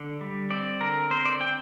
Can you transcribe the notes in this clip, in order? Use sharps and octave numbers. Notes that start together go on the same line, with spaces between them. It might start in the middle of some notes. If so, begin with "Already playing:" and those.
Already playing: D3
G3
C4 D5
D3 A#4
C4 C5
D5
C4 G5